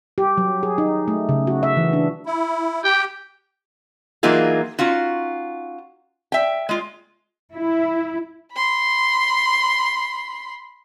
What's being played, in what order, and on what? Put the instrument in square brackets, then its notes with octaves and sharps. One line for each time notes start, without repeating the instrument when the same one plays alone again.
[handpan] G4
F#3
G#4
D#4
A3
C#3
F#4
E5
E3
D4
[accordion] E4
[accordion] G4 [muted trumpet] G5
[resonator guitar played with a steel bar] E3 F#3 A#3 D#4 F4 G#4
C#4 D#4 F4 F#4
E5 G5
G#3 F4
[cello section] E4
[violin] B5 C6